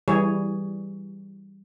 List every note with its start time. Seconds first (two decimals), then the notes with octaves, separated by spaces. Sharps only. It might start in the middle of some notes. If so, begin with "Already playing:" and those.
0.08 E3 G3 G#4 C#5